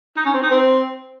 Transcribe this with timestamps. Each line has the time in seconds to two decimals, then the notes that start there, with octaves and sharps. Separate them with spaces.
0.17 D#4
0.25 C#4
0.34 C4
0.42 D#4
0.51 C4